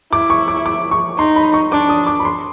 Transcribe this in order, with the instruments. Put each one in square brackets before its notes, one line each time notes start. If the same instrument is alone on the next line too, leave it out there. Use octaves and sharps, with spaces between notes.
[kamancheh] E4 [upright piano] D6
[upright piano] C#6
D6
D6
C#6
[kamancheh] D#4 [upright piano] C6
[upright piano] B5
C#6
[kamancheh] D4 [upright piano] D6
[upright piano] D#6
D6
B5
C6